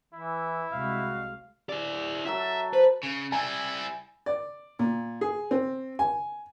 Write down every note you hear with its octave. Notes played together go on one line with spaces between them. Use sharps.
E3 E4
C2 G#3 F#4 F5
E4 D5
F#3 A4 E5
B4 C5
C#3
G3 E4 G#5
D5
A#2
G#4
C4
G#5